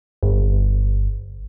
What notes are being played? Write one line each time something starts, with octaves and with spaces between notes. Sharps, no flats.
G1